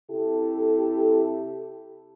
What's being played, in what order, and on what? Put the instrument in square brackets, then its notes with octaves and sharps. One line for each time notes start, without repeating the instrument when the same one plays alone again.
[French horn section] C3 E4 G4 A4